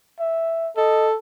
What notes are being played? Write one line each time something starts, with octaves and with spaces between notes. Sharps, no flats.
E5
A4 D#5